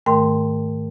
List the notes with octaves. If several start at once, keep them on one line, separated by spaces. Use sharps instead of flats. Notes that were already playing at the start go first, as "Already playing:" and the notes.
G#2 D#3 A3 A#4 G5 C6